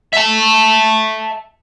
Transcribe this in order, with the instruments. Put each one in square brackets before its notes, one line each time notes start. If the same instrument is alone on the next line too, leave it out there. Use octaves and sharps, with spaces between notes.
[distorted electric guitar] E5 A5